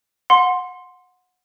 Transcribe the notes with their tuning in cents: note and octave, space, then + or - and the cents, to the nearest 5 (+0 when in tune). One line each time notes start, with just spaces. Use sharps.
F#5 -20 C6 +0